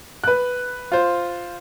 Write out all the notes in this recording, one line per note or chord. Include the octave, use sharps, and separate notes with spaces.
B4 F#6
F4 C5